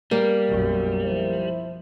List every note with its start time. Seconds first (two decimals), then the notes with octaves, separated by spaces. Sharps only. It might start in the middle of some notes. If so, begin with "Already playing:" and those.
0.11 G3 A#3
0.47 B1 F#2
1.04 F3 E4 C5 E5